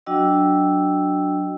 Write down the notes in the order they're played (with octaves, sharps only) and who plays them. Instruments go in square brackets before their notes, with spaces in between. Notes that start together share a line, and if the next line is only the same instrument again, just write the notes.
[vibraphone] F#3 D4 F#4 D#5 G5 E6